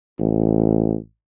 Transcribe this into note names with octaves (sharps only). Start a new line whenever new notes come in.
A1